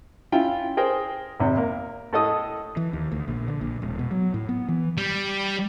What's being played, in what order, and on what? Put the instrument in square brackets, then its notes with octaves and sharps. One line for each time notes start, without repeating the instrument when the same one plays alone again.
[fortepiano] C#4 E4 F4 G5
G#4 A#4 C5 G5
G#1 C3
A#3
A2 A4 D#5 D#6
[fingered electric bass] E3
D#2
D2
A#1
D3
A#1
E1
B2
F#3
A2
B3
E3
[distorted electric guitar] G3